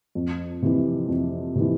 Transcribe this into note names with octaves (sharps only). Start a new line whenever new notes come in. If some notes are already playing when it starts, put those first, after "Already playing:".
F2
C3 E3
F2
C3 E3